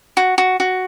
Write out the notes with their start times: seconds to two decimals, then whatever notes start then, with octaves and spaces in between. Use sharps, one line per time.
0.17 F#4
0.38 F#4
0.60 F#4